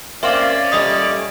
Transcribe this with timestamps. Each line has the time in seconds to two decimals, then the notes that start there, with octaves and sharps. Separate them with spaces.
0.23 A#3 C4 C#4 C5 D5 E5 F5 D6
0.72 A#2 G3 A3 D#5 D#6